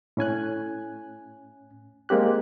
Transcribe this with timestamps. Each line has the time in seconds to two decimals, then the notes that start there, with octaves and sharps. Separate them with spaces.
0.17 A2 C#4 G#5 F#6
2.09 G#3 A#3 C4 G4 F#6